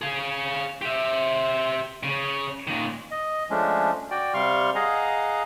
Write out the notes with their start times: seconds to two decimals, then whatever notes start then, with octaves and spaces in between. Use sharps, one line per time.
0.02 G#4 F5
0.82 G4 E5
2.03 C#3
2.67 A#2 D#3
3.11 D#5
3.50 F3 G#3 A3 C#4 D4
4.11 F#4 D5 G5
4.34 C3 G3 F5 C6 C#6 F6
4.75 G#4 D#5 F5 F#5 G#5 A#5